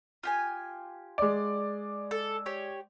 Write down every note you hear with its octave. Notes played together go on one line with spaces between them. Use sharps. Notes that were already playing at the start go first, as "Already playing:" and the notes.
F4 G4 G#5
G#3 D5
A4
G4 C#5